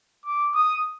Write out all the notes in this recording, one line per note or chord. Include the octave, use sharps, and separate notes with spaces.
D6
D#6